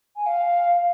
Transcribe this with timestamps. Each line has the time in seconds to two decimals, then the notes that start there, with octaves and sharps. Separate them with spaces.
0.16 G#5
0.26 F5